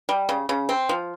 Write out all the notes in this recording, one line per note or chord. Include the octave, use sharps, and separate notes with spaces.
G3
C#3
C#3
C4
F3